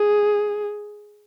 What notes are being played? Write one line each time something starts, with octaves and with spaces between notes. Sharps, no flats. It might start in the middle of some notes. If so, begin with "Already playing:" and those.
Already playing: G#4